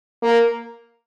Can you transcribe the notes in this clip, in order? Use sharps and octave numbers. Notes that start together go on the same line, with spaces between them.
A#3